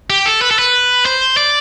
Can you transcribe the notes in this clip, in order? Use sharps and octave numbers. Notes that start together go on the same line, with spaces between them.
G4
A4
B4
A4
B4
C5
D5